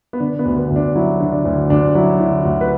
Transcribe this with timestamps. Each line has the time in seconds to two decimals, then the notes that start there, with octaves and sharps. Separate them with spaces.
0.13 B3
0.20 D3 D4
0.39 B3
0.45 D2
0.58 B3
0.70 D2
0.76 D4
0.95 F#3 E4
1.20 D3
1.32 D4
1.45 D2
1.70 D2 D4
1.95 F#3 E4
2.20 D3 E4
2.45 D2 F#4
2.61 B4